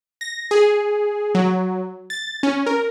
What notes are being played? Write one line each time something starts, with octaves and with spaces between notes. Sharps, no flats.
A#6
G#4
F#3
A6
C#4
A#4